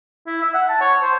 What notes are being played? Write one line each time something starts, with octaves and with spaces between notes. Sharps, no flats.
E4
E5
F#5
A5
C#5
C5